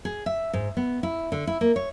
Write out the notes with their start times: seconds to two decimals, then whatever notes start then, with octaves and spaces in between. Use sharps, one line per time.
0.05 G#4
0.26 E5
0.53 G#2
0.77 B3
1.03 E4
1.32 D3
1.47 E4
1.61 A#3
1.76 C#5